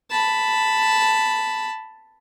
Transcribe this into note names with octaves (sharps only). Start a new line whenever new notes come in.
A5 B5